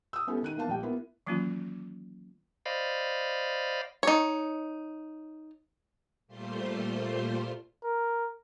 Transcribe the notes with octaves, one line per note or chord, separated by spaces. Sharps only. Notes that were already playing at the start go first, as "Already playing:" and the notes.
D#6 E6
G3 B3 C#4 E4 G4 A4
D#3 F#6 D#7
E3 A#3 B3 F5 A5
A#1 G3 G5
A#3 B3 E4 A#4
D#3 E3 F#3 A#3 C#4 F4
C5 D5 D#5 F5 B5
D#4 C#5
A#2 G3 A3 F4 C5 C6
A#4